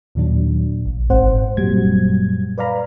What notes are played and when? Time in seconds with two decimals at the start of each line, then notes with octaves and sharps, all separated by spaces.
0.15 D#2 A#2 D#3 F#3 D4
0.86 A#1
1.09 G1 G#2 C4 C5 F#5
1.57 F#2 A#2 F#3 G3 G#6
2.58 B4 D5 F5 A#5 B5